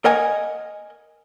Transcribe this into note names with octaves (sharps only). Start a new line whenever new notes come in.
A#4 D#5 F#5 G#5